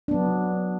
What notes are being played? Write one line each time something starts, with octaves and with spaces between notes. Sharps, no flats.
F#3 B3 D4